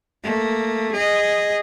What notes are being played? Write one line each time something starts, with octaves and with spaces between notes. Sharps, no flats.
A3 A#3
G#4 D#5